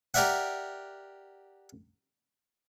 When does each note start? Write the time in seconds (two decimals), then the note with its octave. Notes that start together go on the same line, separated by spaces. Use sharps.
0.14 G4 A#4 D5 E5 F#5